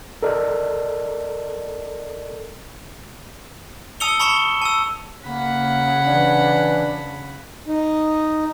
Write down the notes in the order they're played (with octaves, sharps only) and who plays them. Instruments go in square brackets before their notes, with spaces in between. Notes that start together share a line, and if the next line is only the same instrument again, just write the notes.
[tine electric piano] A4 A#4 D5 D#5
[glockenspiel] A5 D#6 E6 C#7 F7 G7
A5 B5 C#6 C#7 E7 G7
A5 E6
[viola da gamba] C#3 [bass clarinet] A#3 [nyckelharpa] F#5 B5
[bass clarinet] E3 [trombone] D4
[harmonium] D#4